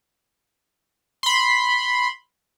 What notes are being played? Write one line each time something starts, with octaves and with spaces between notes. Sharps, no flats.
B5 C6